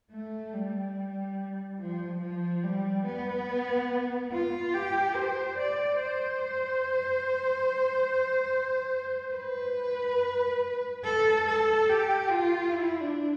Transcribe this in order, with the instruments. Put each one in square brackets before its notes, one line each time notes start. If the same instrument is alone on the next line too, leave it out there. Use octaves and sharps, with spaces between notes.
[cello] A3
G3
F3
F3
G3
B3
F4
G4
C5
D5
C5
B4
A4
A4
G4
F4
E4
D4